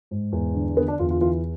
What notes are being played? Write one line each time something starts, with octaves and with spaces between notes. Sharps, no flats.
G#2
E2
D3
D3 B3
D4
E2 F4
F4
E3 F4